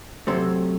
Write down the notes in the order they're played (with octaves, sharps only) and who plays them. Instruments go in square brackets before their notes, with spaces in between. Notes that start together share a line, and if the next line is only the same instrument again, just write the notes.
[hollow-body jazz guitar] C3 F#3 A3 C5